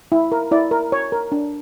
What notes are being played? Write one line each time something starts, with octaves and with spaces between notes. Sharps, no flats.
E4
A#4
E4 D5
A#4
C#5
A#4
D4